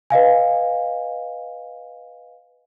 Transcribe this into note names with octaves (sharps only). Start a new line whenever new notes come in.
B4 D#5 F5 G#5